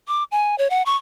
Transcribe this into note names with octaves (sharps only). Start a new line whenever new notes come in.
D6
G#5
C#5
F#5
C#6